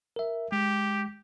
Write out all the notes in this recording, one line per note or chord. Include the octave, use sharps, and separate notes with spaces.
A#4 E5
G#3 G4